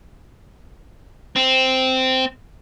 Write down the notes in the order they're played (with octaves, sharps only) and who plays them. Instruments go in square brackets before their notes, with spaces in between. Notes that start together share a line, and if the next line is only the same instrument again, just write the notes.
[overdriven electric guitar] C4